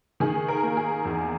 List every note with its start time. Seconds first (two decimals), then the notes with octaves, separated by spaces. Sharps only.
0.20 D#3 G#4
0.48 A#4
0.62 A#3
0.77 G#4
1.05 E2